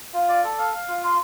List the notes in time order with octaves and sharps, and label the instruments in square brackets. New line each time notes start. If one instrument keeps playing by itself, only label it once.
[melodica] F4 [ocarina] F5
[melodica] D5
A4
F5
F5
F4
[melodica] F5 [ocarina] C6